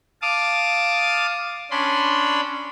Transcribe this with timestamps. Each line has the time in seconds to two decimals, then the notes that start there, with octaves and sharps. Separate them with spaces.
0.22 F5 A5 D6 D#6
1.71 C#4 D4 B5 C6